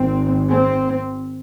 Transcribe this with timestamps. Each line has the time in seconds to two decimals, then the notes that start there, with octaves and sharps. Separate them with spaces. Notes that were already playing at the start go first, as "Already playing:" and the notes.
Already playing: G#1 G#2 C4
0.49 C4